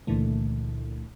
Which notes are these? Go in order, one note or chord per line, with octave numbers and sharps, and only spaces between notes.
C#2 A#2 D3 E3 A3